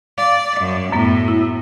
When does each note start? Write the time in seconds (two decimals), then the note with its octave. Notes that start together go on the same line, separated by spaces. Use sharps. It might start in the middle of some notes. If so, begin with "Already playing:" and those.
0.18 D5 F5
0.60 F#2
0.92 F#2 A2 B3
1.28 E4